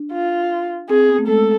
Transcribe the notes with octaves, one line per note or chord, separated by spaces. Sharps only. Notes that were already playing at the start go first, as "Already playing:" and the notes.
Already playing: D4
F4
C4 G#4
B3
A3
G#3 A4